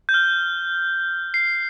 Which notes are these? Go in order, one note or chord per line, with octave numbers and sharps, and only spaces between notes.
G6
F6
C7